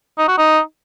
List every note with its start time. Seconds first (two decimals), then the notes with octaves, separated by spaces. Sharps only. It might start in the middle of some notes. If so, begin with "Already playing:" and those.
0.18 D#4
0.28 F#4
0.38 D#4